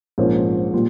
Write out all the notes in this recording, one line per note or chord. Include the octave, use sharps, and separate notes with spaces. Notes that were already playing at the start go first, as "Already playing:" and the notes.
A#1 G#2 F3 A#3 C#4
A#2 G3